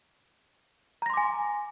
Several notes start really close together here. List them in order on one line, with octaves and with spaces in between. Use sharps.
A#5 A#6 C6 D6 G#5